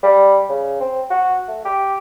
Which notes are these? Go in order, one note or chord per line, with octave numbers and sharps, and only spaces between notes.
G3
C#3
C4
F#4
A3
G4